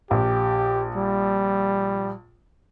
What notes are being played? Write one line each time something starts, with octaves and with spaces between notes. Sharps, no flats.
A#1 G4
G3